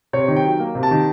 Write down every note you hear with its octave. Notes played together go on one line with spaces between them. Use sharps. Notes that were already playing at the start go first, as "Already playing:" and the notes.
C3 C#5
D#3
G5
F#3
A#3
C3
A5
D#3